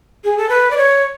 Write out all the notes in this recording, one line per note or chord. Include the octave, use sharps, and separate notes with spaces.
G#4
A4
B4
D5
C#5